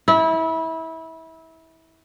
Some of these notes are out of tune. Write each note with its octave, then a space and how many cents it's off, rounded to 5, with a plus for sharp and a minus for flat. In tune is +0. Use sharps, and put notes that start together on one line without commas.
E4 -25